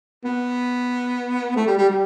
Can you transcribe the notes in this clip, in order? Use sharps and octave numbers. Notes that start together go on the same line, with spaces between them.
B3
A3
G3
G3
G3